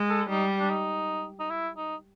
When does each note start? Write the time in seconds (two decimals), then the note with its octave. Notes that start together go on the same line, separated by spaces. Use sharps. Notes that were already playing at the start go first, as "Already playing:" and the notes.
Already playing: G#3
0.10 A4
0.30 G3 D#4
0.60 D4
0.70 D#4
1.40 D#4
1.50 E4
1.77 D#4